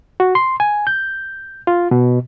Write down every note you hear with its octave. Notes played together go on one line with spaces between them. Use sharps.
F#4
C6
G#5
G6
F4
B2